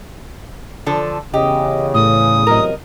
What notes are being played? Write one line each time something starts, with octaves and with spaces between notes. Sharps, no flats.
D3 F3 A4
E2 C#3 G4 D#5
A2 D#6
E2 C3 F#3 A#4 D#5